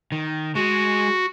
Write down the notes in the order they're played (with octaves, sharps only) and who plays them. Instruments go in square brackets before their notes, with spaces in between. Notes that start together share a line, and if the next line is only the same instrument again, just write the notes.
[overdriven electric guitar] D#3
[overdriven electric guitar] G#3 [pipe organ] F#4